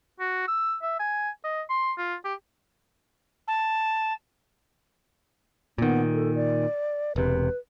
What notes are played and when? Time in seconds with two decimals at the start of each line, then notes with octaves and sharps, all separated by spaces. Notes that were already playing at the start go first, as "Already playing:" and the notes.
0.20 F#4
0.48 E6
0.82 E5
0.99 G#5
1.44 D#5
1.69 C6
1.98 F4
2.25 G4
3.48 A5
5.78 A#2 D#3 B3
6.14 A4
6.35 D5
7.16 E1 C3 B4